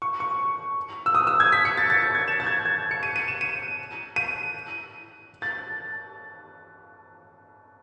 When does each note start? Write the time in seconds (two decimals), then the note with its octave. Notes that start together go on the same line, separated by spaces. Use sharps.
0.02 C#6
0.20 C#6
1.06 E6
1.15 D#6
1.27 E6
1.40 G#6
1.52 B6
1.65 C#7
1.77 A6
1.90 A6
2.02 A6
2.15 G#6
2.28 E7
2.40 A6
2.46 G#6
2.65 G#6
2.91 C#7
3.03 D#7
3.16 D#7
3.28 E7
3.41 D#7
4.16 D#7
5.42 A6